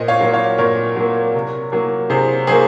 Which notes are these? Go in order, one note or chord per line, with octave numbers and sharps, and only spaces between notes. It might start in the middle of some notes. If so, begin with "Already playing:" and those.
Already playing: A#2 C5 D#5
C#5 F5
F#3 A#3
C#5 F5
A#2 A#4 C#5
F#3 A#3
C3
F#3 A#3
C3 G#4 C5
F#3 A#3 G#4 C5